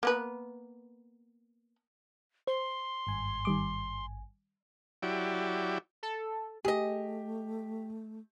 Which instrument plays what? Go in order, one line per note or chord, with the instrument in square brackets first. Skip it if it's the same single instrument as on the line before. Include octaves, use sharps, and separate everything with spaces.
[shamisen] A#3 B3 B4
[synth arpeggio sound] C5 [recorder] C6
[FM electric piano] G#1 G2 G#5
[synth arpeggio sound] D#3 G3 D6
[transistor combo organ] F#3 E4 G4 D5
[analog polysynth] A4
[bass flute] A3 [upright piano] G4 [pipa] G#4 D#5